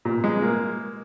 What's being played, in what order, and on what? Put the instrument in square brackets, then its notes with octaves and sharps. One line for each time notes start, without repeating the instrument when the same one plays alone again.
[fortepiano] A#2
G#3
A#3